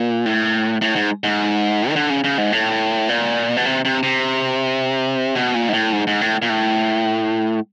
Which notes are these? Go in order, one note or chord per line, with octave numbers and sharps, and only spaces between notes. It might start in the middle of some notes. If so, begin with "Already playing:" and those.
Already playing: A#2
A2
A2
G#2
G#2
D#3
D3
C#3
C#3
G#2
A2
A#2
B2
C3
C3
C3
B2
A#2
G#2
A2
G#2
G#2
A2
A#2
A2